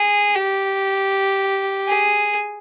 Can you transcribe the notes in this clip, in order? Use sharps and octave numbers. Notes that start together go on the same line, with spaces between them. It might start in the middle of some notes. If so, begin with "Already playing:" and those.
Already playing: G#4
G4
G#4